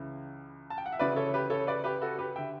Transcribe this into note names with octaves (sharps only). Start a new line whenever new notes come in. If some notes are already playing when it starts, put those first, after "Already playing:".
Already playing: C#2 C#3 E3
A5
G5
F#5
E5
D2 C#3 E3 B4 D5
A4 C#5
G4 B4
A4 C#5
B4 D5
G4 B4
F#4 A4
G4 B4
D3 E5 G5